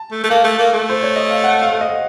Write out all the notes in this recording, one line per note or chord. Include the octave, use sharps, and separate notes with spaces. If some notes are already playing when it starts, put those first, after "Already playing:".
Already playing: A5
A3
A3
A#3 A5
A3
A#3
A3
C5
C#5
D#5
F5
F#5
F5
D#5